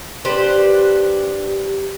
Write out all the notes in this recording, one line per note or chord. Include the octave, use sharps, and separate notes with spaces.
D4 G4 B4 C5